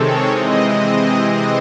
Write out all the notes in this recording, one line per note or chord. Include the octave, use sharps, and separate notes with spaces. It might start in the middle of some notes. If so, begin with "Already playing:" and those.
Already playing: C3 D#3 G#3 C4 A4 C#5
C3 E3 G#3 C4 D#5
D#5